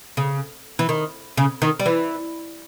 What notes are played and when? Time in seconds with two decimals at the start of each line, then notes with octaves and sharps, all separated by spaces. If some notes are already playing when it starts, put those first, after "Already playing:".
0.17 C#3
0.79 E3
0.89 D#3
1.37 C#3
1.62 D#3
1.80 G3
1.86 E3